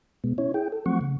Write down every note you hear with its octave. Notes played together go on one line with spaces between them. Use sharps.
B2 G#3 B3
C#4 E4 C#5
E4 G#4 G5
A4
F3 F#3 A3 C4 F#5 C#6
C#3